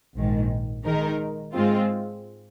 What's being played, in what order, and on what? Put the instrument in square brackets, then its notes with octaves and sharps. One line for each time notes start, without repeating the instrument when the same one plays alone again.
[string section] A#1 G#2 D#3
D#3 G#3 D#4 A#4
G#2 G#3 C4 F4